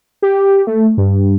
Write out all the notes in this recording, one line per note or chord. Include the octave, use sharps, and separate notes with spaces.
G4
A3
G2